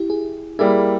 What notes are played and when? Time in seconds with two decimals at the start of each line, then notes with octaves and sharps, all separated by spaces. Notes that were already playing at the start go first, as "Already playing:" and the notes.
Already playing: E4 G4
0.10 G#4
0.59 G3 A#3 E4 G#4